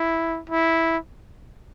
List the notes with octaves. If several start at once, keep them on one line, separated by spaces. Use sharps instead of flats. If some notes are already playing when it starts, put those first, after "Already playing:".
Already playing: E4
E4